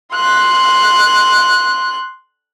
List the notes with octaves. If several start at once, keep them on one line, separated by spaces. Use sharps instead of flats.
C6 F#6